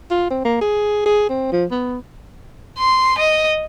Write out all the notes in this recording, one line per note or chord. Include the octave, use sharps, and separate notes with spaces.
F4
C4
A#3
G#4
G#4
C4
F3
B3
C6
D#5